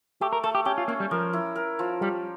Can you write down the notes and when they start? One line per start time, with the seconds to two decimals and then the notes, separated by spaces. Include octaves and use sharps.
0.21 A3 G4
0.33 A#4
0.44 A3 A4
0.55 G4
0.65 C#4 G4
0.78 F4
0.88 A#3 C#4
1.00 G3
1.11 F3 A#4
1.33 E4
1.56 A#4
1.79 F3
2.01 G3 G4